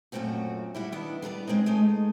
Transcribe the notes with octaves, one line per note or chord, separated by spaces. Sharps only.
F#2 A#2 C#3 A3 C4 F#4
G3 E4 F#4
D#3 B3 D4 E4
G3 B3 A4 D5
G#3 C4 C#4 D#4
G#3 A3 D#4